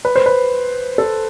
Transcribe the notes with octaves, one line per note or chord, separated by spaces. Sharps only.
B4
C5
B4
A4